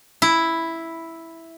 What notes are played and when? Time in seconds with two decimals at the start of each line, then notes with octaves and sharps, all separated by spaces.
0.22 E4